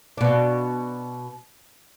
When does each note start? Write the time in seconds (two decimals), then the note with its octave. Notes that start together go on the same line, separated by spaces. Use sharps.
0.17 B2 D4